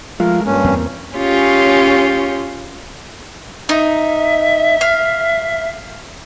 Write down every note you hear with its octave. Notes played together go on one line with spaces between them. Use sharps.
F3 G#3 A3 F4 A#4
G2 A#3 C#4
E2 C4
C#4 F4 G4 G#4 C#5
D#4 E5
F5